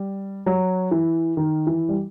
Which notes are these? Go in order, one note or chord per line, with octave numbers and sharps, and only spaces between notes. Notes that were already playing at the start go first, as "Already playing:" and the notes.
Already playing: G3
F#3
E3
D#3
E3
G3